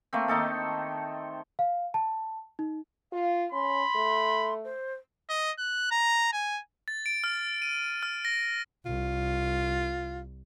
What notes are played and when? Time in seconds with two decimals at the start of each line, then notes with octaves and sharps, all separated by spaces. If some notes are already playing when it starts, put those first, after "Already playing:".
0.13 A3 A#3 C4
0.28 D#3 D#4 A4 A5
1.59 F5
1.94 A5
2.59 D#4
3.12 F4 F5
3.52 C#4 B5 C6
3.95 A3
4.64 C5
5.29 D#5
5.58 F#6
5.91 A#5
6.33 G#5
6.88 A6
7.06 D7
7.24 F6
7.62 D#7
8.03 F6
8.25 A#6
8.86 C2 F4